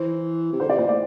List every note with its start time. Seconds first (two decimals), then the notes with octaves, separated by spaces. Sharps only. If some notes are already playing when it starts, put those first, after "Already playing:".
Already playing: E3 C5
0.52 C3
0.60 D3 C5
0.69 C3 D5
0.78 A#2 C5
0.87 A2 D5